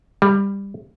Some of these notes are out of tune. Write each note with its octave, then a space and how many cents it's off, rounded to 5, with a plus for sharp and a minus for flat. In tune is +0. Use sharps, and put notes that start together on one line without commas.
G3 +15